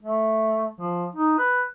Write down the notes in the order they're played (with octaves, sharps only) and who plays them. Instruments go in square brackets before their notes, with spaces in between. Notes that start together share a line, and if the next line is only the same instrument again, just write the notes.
[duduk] A3
F3
D#4
B4